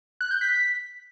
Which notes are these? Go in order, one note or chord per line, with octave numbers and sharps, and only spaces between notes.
F#6
G6
B6